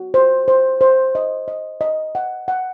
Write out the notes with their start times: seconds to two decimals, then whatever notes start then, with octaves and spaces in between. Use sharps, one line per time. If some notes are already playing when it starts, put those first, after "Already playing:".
Already playing: F#4
0.14 C5
0.48 C5
0.81 C5
1.15 D#5
1.48 D#5
1.81 D#5
2.15 F#5
2.48 F#5